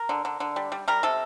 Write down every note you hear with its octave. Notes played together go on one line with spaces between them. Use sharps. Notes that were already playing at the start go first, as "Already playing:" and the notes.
Already playing: A#4
D3
D3
D3
G3
G3
G3 A#4
C3 A4